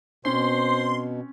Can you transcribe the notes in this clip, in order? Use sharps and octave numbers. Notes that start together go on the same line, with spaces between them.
B2 C4 C#4 C5 C6